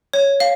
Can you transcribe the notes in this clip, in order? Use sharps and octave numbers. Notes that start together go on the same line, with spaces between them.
C#5
F5